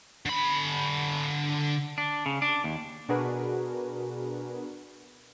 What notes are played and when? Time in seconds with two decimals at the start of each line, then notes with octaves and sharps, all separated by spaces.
0.26 D3 B5
1.98 D4
2.26 C#3
2.42 D4
2.64 D#2
3.09 B2 D4 F#4 G#4 A#4 B4